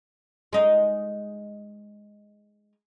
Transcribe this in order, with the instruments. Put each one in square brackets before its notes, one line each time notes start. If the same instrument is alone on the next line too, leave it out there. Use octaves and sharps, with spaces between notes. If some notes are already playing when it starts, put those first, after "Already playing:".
[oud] G#3 D#4